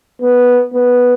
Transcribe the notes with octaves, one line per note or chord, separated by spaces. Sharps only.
B3
B3